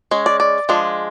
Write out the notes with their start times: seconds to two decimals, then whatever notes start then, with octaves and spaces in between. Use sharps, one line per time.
0.11 G#3 C#4
0.26 D5
0.40 D5
0.69 F3 G#3 D4